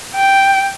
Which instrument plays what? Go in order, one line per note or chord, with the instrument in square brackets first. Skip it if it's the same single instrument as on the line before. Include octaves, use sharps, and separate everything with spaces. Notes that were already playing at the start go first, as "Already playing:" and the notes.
[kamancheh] G5